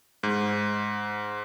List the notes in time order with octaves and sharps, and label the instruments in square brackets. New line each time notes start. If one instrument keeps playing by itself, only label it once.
[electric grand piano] G#2